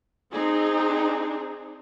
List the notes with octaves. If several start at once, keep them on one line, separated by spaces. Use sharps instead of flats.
C4 D#4 G#4